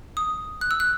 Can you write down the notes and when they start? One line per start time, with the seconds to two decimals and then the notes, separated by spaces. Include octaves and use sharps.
0.17 D#6
0.61 F#6
0.71 E6
0.80 F#6